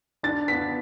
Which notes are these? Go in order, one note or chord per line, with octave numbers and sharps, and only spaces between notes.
D4 A6
B3 B6